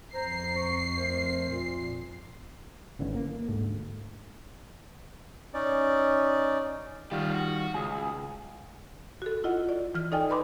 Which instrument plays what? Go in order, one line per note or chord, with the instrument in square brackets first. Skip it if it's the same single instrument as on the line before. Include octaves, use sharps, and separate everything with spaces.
[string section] F2 C7 [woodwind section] C5 A#5
[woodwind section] C#6
A3 A#4 C5
A#2
[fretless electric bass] G#1 D3 E3 C#4
A#3
D2 G#2 A3
[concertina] C#4 D#4 D5
[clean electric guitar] D#3 G3 [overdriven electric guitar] F4 G4
[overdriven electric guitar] F#4
[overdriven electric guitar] C#2 [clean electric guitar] G#4
[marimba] F#4 A4
E4 F4 D#5 F#5
D5
E3 F6
D#4 A4 D5 D#5 G5 G#5
B4 D5 B5 C6 D6